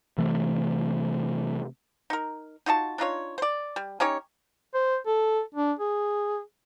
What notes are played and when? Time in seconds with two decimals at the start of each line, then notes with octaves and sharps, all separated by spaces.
0.18 C3 E3 A3
2.10 D#4 A#4
2.66 D#4 F4 F#4 A5
2.98 D4 D#4 F4 C#5
3.38 C5 D5
3.76 G3
4.00 C#4 D#4 G4 C#5
4.74 C5
5.06 A4
5.54 D4
5.79 G#4